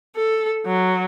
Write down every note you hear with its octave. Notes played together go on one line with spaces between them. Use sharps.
A4
F#3